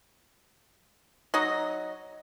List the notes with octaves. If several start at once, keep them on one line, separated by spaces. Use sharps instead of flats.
F#3 D#4 D#5